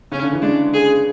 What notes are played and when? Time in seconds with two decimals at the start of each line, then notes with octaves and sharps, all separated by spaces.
0.12 C#3 C#4
0.22 D3
0.33 E3
0.42 G#3 D4
0.74 G#4